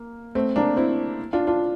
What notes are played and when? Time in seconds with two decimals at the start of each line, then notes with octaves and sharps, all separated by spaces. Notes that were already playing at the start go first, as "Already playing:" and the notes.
Already playing: A#3
0.35 A3 C4
0.56 A#3 D4
0.77 C4 E4
1.33 D4 F4
1.47 D4 F4